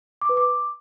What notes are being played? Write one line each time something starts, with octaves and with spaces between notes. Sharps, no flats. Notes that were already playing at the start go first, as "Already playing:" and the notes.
D6
B4
D6